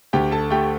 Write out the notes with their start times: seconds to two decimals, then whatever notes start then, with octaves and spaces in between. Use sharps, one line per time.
0.13 D2 G4 G5
0.32 A4 A5
0.50 A3 G4 G5